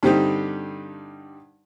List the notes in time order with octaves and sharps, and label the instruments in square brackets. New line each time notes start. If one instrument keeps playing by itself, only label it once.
[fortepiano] G2 D3 G3 C4 D#4 G4